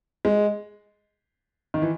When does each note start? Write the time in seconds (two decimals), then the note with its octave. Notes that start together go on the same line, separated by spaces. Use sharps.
0.25 G#3
1.74 D#3
1.82 E3